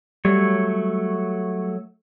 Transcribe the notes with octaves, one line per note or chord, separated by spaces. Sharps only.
F#3 G3 A3 C#5